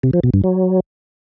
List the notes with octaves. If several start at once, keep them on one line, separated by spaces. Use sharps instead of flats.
C3
F3
B2
G2
F#3